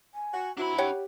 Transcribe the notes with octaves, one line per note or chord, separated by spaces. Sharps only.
G#5
F#4
F#3 C4 D4 E4 F#4 B5
G4 C#5 F#5 G5